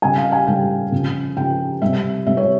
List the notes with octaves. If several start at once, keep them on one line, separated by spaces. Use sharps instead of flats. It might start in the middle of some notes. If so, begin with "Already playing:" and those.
C#3 G3 G#5
F5
G#5
C#3 G3 G5
C#3 F3
C#3 F3 G5
C3 G3 E5
C3 G3 E5
C#5